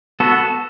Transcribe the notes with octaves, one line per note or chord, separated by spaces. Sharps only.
B3 F#4 A4